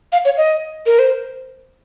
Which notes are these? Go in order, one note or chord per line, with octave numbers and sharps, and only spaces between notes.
F5
C#5
D#5
A#4
C5